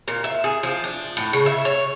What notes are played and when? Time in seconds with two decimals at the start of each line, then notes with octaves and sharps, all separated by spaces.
0.08 A#2
0.24 E5
0.44 G#4
0.63 F3
0.84 D4
1.17 A2
1.33 C#3
1.46 E5
1.65 C#5